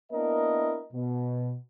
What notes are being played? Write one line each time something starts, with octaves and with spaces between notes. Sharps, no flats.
A#3 B3 D4 E4 A#4 D#5
B2